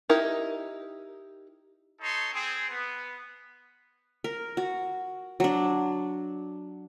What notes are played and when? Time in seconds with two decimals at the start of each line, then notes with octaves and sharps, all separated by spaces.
0.09 D#4 E4 G4 A#4
2.01 D#4 A4 C#5 C6
2.32 C4 G#4
2.69 B3
4.24 A#4
4.57 F#4
5.40 F#3 D4